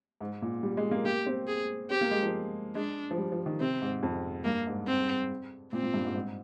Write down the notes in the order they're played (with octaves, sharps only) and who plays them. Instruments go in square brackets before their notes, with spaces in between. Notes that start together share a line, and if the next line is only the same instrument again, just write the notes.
[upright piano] G#2
A#2
G3
G#3
A#3
[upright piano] A#3 [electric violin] G4
[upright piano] C4
[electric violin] G#4
[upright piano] C4 [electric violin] G4
[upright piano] A#3
G#3
F3
[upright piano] G#3 [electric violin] D4
[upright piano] F3
G3
F3
D#3
[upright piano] C3 [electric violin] C4
[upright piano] G#2
F2
[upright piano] G2 [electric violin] A#3
[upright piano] G#2
[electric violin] C4
[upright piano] A#2 [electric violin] C4
[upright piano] A#2
G2
G#2
G#2